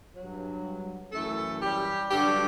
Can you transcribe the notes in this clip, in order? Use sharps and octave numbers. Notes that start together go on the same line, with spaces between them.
G2 F#3
F#2 E3 A3 A4
G3 G4
G2 D3 F#3 G3 G4